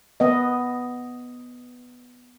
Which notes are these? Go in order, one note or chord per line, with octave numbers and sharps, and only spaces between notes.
B3 D#5